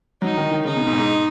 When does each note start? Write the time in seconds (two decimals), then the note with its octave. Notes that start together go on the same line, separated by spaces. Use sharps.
0.22 F#3 D#4
0.37 D#3
0.51 D#3
0.65 C#3 D#4
0.76 B2
0.87 G#2
0.93 B2
0.98 G#2